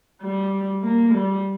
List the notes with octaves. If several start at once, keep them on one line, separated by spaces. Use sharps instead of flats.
G3
A#3
G3